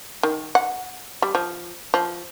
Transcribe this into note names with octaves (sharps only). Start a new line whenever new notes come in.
D#3
F#5
G3
F3
F3